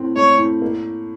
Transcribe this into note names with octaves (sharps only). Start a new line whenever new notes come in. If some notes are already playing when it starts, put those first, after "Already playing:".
Already playing: A2 C4
A3 C#5
A2
A#3